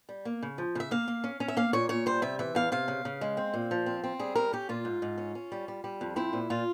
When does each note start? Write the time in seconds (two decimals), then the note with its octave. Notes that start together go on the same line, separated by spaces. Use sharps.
0.09 G3
0.25 A#3
0.43 C#3
0.58 F3
0.75 C#3 E5
0.91 A#3 F5
1.08 A#3
1.24 C#4
1.40 C#4
1.48 E5
1.57 A#3 F5
1.73 A#2 C#5
1.89 A#2 C#5
2.06 G3 C5
2.22 C3 E5
2.39 E3 E5
2.55 E2 F5
2.72 C3 F5
2.88 C#3
3.05 C#3
3.21 G#3
3.37 C4
3.54 A#2
3.71 F3
3.86 C4
4.04 C4
4.19 G3 G#4
4.35 G3 A#4
4.53 C#4 G4
4.69 A#2 F4
4.85 G#2
5.02 G#2
5.18 C#4
5.35 C#4
5.52 G3
5.68 G3
5.84 G3
6.01 F2
6.16 C4 E4
6.33 A#2
6.50 A#2 F4